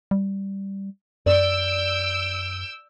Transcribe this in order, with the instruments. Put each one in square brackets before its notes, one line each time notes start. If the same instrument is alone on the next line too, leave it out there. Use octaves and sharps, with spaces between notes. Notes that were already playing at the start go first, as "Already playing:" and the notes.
[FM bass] G3
[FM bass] F#2 [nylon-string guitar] D5 [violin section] E6 G6 D7